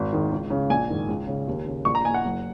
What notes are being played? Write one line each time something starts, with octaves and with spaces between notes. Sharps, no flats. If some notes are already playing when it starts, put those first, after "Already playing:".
Already playing: G#1
G#2 D#3
C#2
C#3
A#1 G#5
G#2 D#3
C#2
C#3
D#2
C#3
A#1 C#6
A#5
A#2 G#5
F#5
F#1